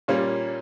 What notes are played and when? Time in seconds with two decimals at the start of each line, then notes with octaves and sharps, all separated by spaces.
0.08 A#2 G3 A#3 C#4